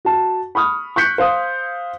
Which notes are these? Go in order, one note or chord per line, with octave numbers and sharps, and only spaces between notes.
F#4 A5
B5 C#6 D#6 F6
C#6 F#6 G6 B6 C#7
C5 F5 D#6